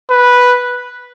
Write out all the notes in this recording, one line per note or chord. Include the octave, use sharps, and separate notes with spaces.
B4